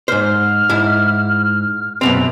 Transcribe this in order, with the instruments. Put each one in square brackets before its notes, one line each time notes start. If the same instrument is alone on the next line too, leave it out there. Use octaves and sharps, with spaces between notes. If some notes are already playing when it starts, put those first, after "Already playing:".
[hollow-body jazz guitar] G#2 C5 [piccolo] F6
[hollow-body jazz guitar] G#2 E4
[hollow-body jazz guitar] F#2 B2 C4 [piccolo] F7